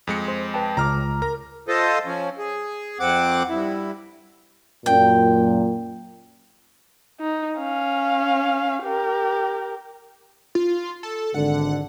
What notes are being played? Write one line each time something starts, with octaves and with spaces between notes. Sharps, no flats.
F2 G#3 C#7
C5
B4 G5 A5
C#2 A#5 D6 F6
A#4 A#5
F4 A4 C5 D#5
F3 C#4
G#4
F2 C4 F#5 D6
G2 E4
F#2 A#2 G5
D#4
C#4 F5
G4 A#4
F4
A4
G#1 D3 F#5